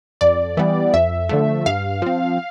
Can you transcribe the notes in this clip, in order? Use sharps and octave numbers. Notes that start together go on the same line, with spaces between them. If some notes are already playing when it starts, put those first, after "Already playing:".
F2 D5
E3 G3 B3
F2 E5
D3 F3 A3
G2 F5
F3 C4